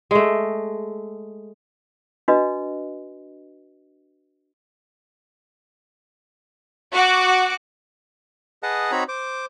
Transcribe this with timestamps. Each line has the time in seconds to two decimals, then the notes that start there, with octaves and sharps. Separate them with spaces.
0.11 G#3 A3
2.28 D4 F#4 B4 D#5
6.93 F#4 F#5 D6
8.63 G#4 B4 D#5 F#5 A5
8.92 C4 D#4 F#4 C#5 A#5 B5
9.08 C5 D6